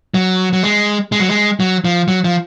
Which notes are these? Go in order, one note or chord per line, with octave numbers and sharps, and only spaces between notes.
F#3
F#3
G#3
G#3
F#3
G#3
F#3
F3
F#3
F3